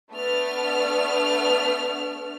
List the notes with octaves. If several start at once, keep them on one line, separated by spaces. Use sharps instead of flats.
A3 B3 D4 F6